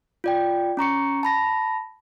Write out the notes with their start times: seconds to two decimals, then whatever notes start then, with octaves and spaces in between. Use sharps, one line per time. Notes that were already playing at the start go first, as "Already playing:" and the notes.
0.24 F4 D5 G5
0.77 C#4 A#5 C#6 C#7
1.23 A5 B5 A#6